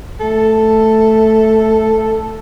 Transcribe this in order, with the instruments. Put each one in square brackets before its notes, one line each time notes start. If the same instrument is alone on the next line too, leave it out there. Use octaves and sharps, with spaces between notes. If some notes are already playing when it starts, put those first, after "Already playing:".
[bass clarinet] A3 [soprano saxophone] A4